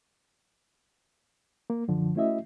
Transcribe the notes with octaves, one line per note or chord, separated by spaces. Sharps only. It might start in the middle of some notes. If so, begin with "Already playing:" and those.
A#3
F#2 D3 F3
A3 C#4 E4 F#4 D#5 E5